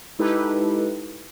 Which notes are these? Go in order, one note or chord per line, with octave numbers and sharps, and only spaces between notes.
G#3 D#4 E4 G4 A4 B4